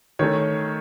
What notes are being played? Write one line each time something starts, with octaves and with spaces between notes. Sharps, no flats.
D#3 A3 C#4 C#5